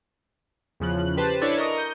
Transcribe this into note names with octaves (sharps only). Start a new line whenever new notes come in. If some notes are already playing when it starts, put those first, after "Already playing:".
E2 C#3 F3 F#6
G4 B4 C5 A5
D4 E4 A4 B4 C#5 D5
A#4 D#5 A#5 C#6 D#6
G6